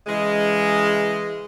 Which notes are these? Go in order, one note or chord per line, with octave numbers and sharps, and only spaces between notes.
C#3 E3 G#3